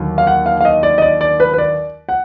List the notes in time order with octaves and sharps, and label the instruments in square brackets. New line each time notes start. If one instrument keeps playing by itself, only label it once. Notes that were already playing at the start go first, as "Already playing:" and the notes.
Already playing: [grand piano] D#2 D3 F#3
F5
F#5
F5
F5
D#5
D5
D#5
D5
D5
B4
B4
D5
F#5